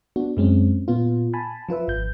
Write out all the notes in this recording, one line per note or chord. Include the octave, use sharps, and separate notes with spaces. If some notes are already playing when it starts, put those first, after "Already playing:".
B3 D4 F#4
F#2 G#3 C4 C#4
A#2 B3 F4
G#5 A5 B5
F3 F4 B4 E5
G#1 G6